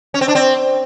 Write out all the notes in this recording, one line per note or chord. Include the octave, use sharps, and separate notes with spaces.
C#4
C4
D4
C4